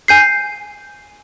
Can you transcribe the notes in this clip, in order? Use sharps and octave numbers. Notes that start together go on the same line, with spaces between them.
G#5 G6 C7